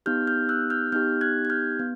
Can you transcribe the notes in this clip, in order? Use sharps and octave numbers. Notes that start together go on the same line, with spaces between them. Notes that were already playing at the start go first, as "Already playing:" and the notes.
B3 D#4 G4 F6 G6
F6 G6
E6 F#6
F6 G6
B3 D#4 G4 F6 G6
F#6 G#6
G#6
F6 G6
B3